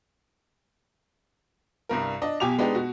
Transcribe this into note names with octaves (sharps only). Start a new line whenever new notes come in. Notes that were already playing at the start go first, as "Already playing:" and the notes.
C2 G2 A#4
D4 D#5
B1 B2 G4 G#5 D6 F7
G#3 B3 D4 D#4 G4
B2 F#4